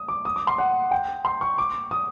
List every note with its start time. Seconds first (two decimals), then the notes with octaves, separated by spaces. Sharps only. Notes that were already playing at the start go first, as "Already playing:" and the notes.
Already playing: D#6
0.08 D6
0.25 D#6
0.36 D6
0.47 C6
0.58 F#5
0.91 G5
1.25 C6
1.41 C#6
1.58 D6
1.91 D#6